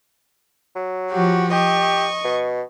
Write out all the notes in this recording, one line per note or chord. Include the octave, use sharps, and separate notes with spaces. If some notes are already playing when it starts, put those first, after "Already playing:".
F#3
F3 F#4 G4
G4 D#5 C#6
B2